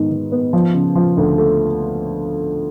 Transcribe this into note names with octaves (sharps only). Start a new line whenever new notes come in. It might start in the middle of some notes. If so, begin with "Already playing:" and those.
Already playing: G#2 D#3 B3
D#3
B3
F3
C#3
F3
D2
A3